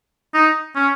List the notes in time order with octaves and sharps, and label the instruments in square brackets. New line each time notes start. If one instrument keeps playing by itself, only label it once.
[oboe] D#4
C#4